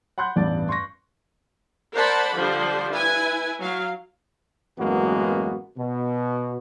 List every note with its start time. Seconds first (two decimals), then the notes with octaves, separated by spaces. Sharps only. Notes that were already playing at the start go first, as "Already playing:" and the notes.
0.18 F#5 B5 C6 F#6 G6
0.36 A1 E2 G2 D5 A6
0.69 C6 C#6 A#6
1.94 A#4 C5 D5 F#5 A5 B5
2.34 D3 F3 G3 D4 C5
2.91 E4 B4 G#5
3.60 F#3 F5
4.78 A1 F#2 G#3 A#3 B3 F#4
5.78 B2